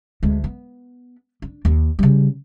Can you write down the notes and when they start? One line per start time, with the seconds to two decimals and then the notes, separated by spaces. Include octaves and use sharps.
0.23 D2 G#3
0.44 B3
1.42 D4
1.65 D#2
1.99 C#3 G3